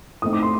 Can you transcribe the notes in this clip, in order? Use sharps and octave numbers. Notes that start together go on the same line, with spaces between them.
A2 A3 C4 D#4 D#6
D6
C6